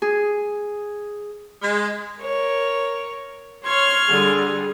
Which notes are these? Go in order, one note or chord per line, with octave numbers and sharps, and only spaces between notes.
G#4
G#3
A#4 C#5
C#5 C6 F6 G#6
D3 G3 G#4